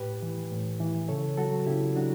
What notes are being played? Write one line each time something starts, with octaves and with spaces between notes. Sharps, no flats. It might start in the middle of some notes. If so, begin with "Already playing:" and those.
Already playing: A2 G4 B4
E3
A2
E3
C#3 A4 C#5
F#3 F#4 A4
C#3 E4 G4
F#3 D4 F#4